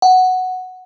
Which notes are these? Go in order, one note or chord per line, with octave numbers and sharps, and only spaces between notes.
F#5